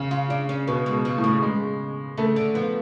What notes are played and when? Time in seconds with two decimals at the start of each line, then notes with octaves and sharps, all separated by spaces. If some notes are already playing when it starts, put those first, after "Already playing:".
Already playing: C#3
0.11 F4
0.30 D4
0.49 C#4
0.68 B2 B3
0.86 G#3
0.92 B2
1.05 F3
1.18 A2
1.24 C#3
1.42 G#3
2.18 C#3 A3
2.36 D3
2.55 F3 B3